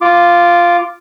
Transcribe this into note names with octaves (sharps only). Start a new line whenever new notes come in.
F4 D6